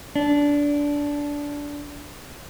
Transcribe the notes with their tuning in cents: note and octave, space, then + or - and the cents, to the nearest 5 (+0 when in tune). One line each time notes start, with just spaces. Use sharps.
D4 -15